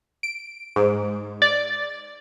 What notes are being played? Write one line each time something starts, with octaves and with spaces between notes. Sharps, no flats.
D7
G#2
D5